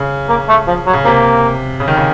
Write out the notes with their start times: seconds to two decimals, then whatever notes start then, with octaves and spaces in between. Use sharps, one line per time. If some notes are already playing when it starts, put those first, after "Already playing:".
Already playing: C#3
0.29 A#3
0.49 A3
0.67 F3
0.87 F#3
0.93 C#3
1.04 C3 A#3
1.80 C#3
1.88 D#3
1.97 C#3